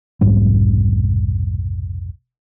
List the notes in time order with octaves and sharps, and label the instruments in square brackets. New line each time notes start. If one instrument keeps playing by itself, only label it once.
[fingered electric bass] F1 B1 G#2 G3